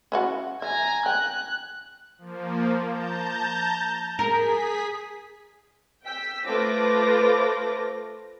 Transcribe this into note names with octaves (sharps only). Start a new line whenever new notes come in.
C#4 E4 F#4
E5 G#5 A#5
G5 F#6
F3 A#3
A5 A#5 G6
G#4 A#4 B6
G5 E6 B6
A3 F4 B4 C5 D6 A#6